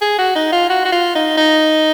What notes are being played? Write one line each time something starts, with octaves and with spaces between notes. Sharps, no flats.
G#4
F#4
D#4
F4
F#4
F#4
F4
D#4
D#4